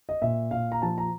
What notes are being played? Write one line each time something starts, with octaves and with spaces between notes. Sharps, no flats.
D#5
A#2 E5
A#2 F5
A#5
F3 A5
A#5